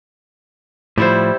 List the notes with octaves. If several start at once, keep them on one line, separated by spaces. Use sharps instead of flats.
A2 F3 G3 E4 C5